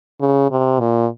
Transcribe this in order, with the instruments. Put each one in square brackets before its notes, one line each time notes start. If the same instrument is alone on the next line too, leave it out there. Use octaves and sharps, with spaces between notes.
[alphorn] C#3
C3
A#2